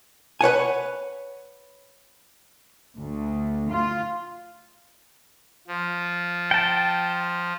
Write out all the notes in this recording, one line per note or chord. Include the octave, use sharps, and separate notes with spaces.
B4 C#5 F#5 G#5
D2
F4
F3
G5 A5